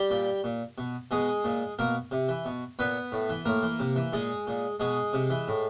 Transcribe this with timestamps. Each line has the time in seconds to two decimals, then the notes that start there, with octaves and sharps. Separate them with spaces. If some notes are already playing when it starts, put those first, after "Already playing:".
Already playing: G3 G4
0.10 A#2
0.44 A#2
0.78 B2
1.11 B2 G#3 G#4
1.44 A#2
1.79 B2 A#3 A#4
2.11 C3
2.29 E3
2.45 B2
2.79 A#2 B3 B4
3.12 A2
3.30 E3
3.46 A2 A#3 A#4
3.63 E3
3.80 C3
3.96 E3
4.13 A#2 G#3 G#4
4.47 A#2
4.80 B2 G#3 G#4
5.13 C3
5.30 E3
5.48 A2